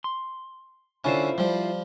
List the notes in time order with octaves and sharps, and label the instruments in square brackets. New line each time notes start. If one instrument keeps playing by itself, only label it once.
[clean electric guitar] C6
[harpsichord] D3 C#4 [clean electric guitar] E4 F4 C5
[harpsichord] F3 G3